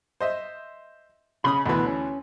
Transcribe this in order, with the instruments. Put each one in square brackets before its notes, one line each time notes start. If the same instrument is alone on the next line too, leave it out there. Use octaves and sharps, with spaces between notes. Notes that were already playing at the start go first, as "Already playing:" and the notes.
[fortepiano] C5 D#5 E5
[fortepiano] C#3 C#4 D#6 [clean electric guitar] B5
[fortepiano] D2 E3 [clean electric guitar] B2 B4
[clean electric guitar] C#4